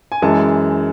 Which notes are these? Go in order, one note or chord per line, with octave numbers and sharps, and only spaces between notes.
G#5
F#2 E3 G#3 A5